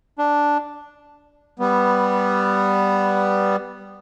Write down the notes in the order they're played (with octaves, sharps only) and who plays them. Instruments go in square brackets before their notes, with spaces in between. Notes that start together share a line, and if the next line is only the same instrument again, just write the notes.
[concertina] D4
[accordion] G3 B3